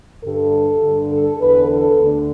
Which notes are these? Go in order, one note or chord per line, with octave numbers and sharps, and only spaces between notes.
G2 D3 A4
G2 D3
A4
E2 D3 B4
A4
D2 D3